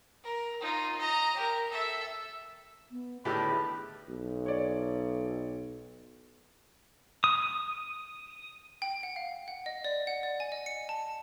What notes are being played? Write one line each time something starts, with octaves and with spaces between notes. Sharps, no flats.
A#4
D#4 F4
D#5 A#5
G4 A#4
A4 E5
B3
A2 D3 D#3 A3 G4 G#4 B4
B1
C#5 D5
D#6
G5
F#5
F5
F#5
D#5
D5
F#5
D5
G#5
D#5
C#7
A5